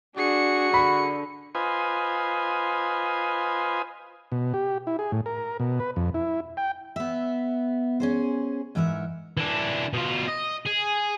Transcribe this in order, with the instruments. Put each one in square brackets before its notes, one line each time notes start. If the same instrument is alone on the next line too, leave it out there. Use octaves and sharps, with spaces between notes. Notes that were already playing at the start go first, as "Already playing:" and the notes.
[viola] D4 [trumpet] F#4 [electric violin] G#4 C#7
[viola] D3 [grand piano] B5
[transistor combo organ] F4 B4 C5 D#5 G#5
B2
G4
E4
G#4
A2
A#4
B2
B4
F2
E4
G5
[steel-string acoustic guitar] B3 E5
C#4 G#4 C5
G#2 E3 A#4 E5 F#5
[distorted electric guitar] E3 D4
B2 F4
D#5
G#4